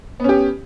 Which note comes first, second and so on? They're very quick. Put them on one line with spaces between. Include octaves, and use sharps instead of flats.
B3 C#4 G4